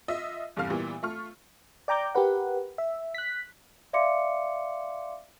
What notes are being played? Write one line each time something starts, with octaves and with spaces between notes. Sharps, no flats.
F4 D#5 E5
E2 G2 C3 A4 F5 F6
A#2 E3 G3 B3
A3 F4 C#6 F6
D5 G5 A#5 D6 G6
G4 A#4 B4 F#5
E5
F#6 B6
D5 E5 F5 C6 D6 C#7